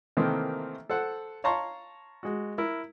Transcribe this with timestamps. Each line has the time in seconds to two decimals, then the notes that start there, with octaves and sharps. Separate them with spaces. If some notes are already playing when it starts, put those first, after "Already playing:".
0.17 C3 D#3 E3 A3 A#3 C4
0.90 A4 C5 F#5
1.44 C#5 F5 A5 A#5 C6 C#6
2.23 G#3 F#4
2.58 E4 A#4